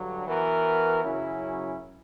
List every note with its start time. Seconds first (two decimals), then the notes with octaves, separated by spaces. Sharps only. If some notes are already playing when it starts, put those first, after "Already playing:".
Already playing: G2 D3 F#3
0.28 E3 B3 F#4 A#4
1.03 F#2 C#3 F#3 C#4 E4